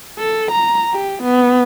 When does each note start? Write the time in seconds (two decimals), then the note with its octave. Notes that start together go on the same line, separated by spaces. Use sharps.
0.19 A4
0.51 A#5
0.93 G4
1.22 B3